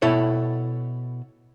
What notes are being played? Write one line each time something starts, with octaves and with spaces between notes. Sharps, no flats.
B2 E4 A4 C#5